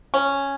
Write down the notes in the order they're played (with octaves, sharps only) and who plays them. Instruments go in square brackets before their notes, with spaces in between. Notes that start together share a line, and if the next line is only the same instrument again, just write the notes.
[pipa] C#4